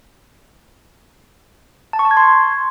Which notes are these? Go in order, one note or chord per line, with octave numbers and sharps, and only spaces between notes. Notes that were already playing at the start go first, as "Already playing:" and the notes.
A5
C#6
A5
G#6
C6